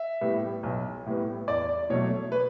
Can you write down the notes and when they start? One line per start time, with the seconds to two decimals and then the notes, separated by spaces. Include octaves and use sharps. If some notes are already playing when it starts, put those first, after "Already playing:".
Already playing: E5
0.21 A2 G3 B3
0.63 B1
1.06 A2 G3 B3
1.48 E2 D5
1.90 B2 F#3 A3 C#5
2.32 B4